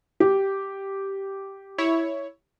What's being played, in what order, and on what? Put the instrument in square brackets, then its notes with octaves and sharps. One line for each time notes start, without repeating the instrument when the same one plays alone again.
[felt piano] G4
[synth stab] E4 C#5